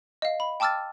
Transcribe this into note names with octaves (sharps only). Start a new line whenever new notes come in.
D#5 F5
B5
G5 A5 D6 E6 F6 A6